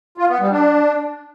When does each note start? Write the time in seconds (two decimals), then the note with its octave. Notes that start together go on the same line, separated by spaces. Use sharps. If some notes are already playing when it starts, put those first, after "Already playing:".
0.18 F4
0.29 B3
0.40 G3
0.52 D4